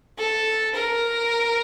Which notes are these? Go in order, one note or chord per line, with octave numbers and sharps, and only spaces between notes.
A4
A#4